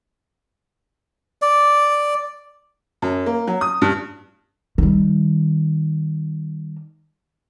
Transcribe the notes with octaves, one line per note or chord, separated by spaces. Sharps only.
D5
F#2
A#3
F#3
D#6
G2
D#3 G3